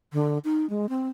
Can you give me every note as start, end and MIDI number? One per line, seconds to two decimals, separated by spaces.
0.13 0.38 50
0.44 0.68 63
0.70 0.89 56
0.89 1.08 60